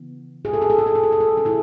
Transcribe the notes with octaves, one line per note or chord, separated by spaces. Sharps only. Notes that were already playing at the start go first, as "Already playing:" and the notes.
Already playing: C#3 E3 B3
G#4
A4
G#4
A4
G#4
A4
G#4
A4
G#4
A4
G#4
D3 A3 C#4 A4
E4 G#4